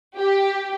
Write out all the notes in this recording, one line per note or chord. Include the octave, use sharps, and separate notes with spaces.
G4